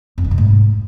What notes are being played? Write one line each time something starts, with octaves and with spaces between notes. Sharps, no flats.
F2
D#3
B2
G#2